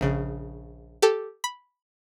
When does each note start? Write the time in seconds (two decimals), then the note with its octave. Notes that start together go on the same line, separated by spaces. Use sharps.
0.01 A#1 C#3
1.02 G4 A4
1.44 B5